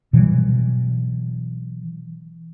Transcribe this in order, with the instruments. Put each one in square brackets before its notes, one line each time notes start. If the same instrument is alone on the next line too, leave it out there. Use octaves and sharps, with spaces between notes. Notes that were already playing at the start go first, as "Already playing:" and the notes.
[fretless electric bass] B2 E3 F#3 G3